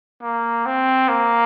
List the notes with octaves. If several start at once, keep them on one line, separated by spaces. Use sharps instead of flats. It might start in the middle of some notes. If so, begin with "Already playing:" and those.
A#3
C4
A#3